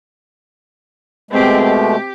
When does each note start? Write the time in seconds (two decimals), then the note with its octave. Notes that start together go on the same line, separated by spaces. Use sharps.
1.31 B2 G#3 A3 C4 G4
1.66 G4